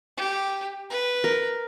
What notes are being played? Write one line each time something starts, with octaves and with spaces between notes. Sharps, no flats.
G4
B4
A#4